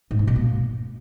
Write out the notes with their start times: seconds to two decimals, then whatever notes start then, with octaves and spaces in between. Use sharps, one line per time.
0.11 G#2
0.19 C3
0.27 B2
0.36 A#3